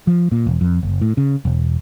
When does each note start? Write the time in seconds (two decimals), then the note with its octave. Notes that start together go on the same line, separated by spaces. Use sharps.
0.07 F3
0.32 A#2
0.47 E1
0.61 F2
0.83 F#1
1.02 A2
1.17 C#3
1.45 E1